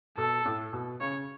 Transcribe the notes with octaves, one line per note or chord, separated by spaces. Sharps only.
B2 A4
A2
B2
C#3 C#5